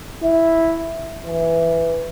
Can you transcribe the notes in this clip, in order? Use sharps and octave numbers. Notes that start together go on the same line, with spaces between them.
E4
E3